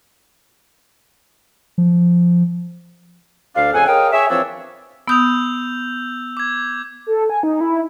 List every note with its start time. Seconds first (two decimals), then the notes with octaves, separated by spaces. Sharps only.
1.78 F3
3.55 D2 D4 F5
3.74 F2 C#3 A4 F#5 G#5
3.88 G#4 A#4 C#5 D#5 F5 G5
4.12 G#4 C#5 E5
4.29 E3 F3 C4 D4 C#5 E6
5.08 B3 D#6 E6 G6 F7
6.37 D6 G#6
7.07 A4
7.30 G#5
7.43 D#4
7.61 E4